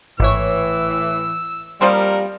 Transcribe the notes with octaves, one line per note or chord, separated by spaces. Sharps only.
G#1 A2 E3 C#5 E6
F3 G3 A#3 C4 A#4